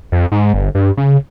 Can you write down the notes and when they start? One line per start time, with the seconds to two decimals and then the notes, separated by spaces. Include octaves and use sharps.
0.12 F2
0.32 G#2
0.54 G1
0.75 G2
0.97 C#3